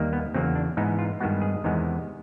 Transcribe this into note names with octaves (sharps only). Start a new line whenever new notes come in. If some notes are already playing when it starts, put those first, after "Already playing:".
Already playing: D#2 D#3 G3 A#3
B3
E2 C#3 F#3 A#3 C4
D4
G#2 E3 G#3 B3 D#4
F4
G2 D#3 G#3 B3 F#4
G#4
E2 C3 D#3 G#3 B3